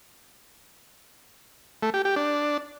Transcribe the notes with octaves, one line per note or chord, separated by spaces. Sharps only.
A3
G4
G4
D4